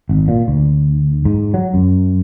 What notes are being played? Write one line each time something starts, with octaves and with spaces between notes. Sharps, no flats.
G#1
A#2
D2
G#2
F#3
F#2